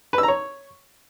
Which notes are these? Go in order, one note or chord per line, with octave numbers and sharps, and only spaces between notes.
B4
E6
A#5
C#5